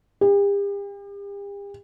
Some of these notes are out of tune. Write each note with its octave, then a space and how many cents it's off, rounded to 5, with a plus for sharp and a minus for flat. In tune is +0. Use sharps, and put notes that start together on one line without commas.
G4 +40